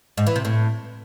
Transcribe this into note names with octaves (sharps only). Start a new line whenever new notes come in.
G#2
E3
C3
A2